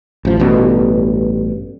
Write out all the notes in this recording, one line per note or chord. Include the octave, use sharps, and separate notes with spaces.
A1 F3
A1 G2 B2